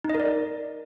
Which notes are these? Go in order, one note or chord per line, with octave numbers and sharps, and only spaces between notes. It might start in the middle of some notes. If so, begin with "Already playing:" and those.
D#4
D#5
A#4
D5